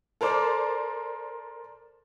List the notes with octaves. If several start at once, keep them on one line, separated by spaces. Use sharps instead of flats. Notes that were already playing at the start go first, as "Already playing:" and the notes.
A4 A#4 C5 D5